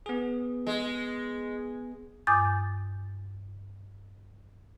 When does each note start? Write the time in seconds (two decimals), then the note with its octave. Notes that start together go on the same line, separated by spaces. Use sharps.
0.06 B3 G#4
0.67 G#3
2.27 G2 G#5 D6 D#6 G6 A6